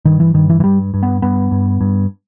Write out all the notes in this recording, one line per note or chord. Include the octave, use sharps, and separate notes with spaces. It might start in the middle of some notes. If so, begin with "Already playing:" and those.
G2 D#3
E3
G2 D#3
E3
E3
G2 G3
G2
B3
G2 B3
G2
G2